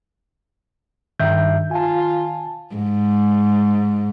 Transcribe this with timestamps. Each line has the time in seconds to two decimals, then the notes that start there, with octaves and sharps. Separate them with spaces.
1.20 G2 D#3 E5 G6
1.71 F4 G#5 A5
2.75 G#2